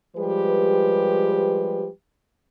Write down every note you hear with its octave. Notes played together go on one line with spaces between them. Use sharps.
F3 G3 G#3 G4 B4